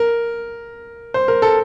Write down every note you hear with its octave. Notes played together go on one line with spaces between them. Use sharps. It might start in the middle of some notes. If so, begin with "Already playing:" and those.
Already playing: A#4
C5
A#4
A4